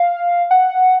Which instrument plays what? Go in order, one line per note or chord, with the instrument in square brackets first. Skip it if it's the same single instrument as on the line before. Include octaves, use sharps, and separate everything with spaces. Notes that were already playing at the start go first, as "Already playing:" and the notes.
Already playing: [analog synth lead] F5
F#5